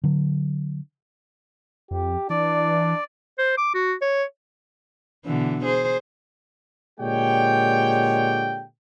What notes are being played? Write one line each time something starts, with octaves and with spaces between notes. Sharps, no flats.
D3 F#3
F2 G4
E3 D4 D5
C5
D6
F#4
C#5
B2 D3 E3
G#4 C5
A#2 D3 G#3 G4 C#5 G5